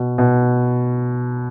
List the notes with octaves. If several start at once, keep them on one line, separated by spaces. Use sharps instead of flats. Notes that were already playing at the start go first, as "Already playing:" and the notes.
Already playing: B2
B2